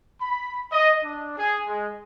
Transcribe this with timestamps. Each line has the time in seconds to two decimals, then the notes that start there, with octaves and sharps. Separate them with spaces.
0.21 B5
0.72 D#5
1.04 D4
1.38 G#4
1.67 G#3